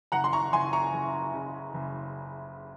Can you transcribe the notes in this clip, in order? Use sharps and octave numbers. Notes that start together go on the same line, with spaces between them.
F#1 F#5 A#5
C6
A#5 C#6
F#1 G#5 C6
A#5 C#6
F#1
C#3
F#1